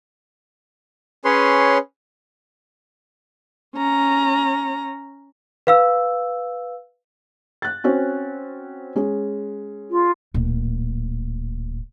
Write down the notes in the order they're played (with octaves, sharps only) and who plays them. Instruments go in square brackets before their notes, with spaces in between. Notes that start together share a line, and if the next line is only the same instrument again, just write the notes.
[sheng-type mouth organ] C#4 G#4 B4 C#5 C6
[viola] C#4 A#5
[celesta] B4 F5 E6
[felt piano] F#6 A6
C4 C#4 F#4
G#3 C#4
[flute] F4
[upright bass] D1 A#2